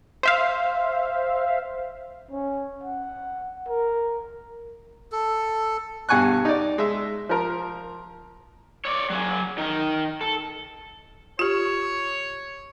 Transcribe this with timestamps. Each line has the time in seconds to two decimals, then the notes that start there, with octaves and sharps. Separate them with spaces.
0.23 C5 E5 F5
2.31 C#4
2.84 F#5
3.69 A#4
5.12 A4
6.09 G2 B2 F#5 G#5 C#6 F#6
6.45 D#4 D5
6.78 G#3 E5
7.29 F3 A#4
8.85 C#5 D5
9.10 F#3 G#4
9.58 D#3 A#4
10.21 A4
11.39 F4 G4 C#5